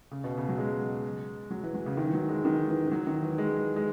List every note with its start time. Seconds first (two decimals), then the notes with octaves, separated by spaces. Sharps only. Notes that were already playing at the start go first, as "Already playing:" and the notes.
0.11 C#3
0.24 B2
0.38 C#3
0.49 F#3
0.58 G#3
1.51 F#3
1.63 E3
1.74 F#3
1.86 C#3
1.97 D#3
2.08 E3
2.14 F#3
2.29 G#3
2.45 D#3
2.68 E3
2.86 E3
2.91 F#3
3.07 D#3
3.23 E3
3.38 G#3
3.76 G#3